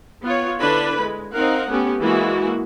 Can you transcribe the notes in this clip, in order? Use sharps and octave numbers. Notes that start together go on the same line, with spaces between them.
B3 F4 C#5
D3 D4 E4 B4 B5
G#3
C4 D#4 A#4 F5 F#5
A3 B3 C#4 G4
E3 G#3 A#3 E4 F#4